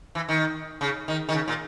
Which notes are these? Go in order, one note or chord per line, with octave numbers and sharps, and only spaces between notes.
E3
D#3
C#3
D#3
D#3
C#3
A#2